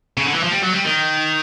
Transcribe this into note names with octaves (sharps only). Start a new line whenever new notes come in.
C#3
D3
E3
F3
G3
F#3
G3
D#3